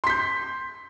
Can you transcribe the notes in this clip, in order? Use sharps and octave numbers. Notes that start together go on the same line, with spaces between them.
C6 G6 B6